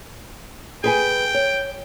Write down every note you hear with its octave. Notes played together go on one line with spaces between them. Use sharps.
G#4 B4 G5 G#5
C#5